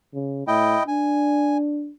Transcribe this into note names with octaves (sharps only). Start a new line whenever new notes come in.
C#3
A2 E4 D#5 G5
D4 G#5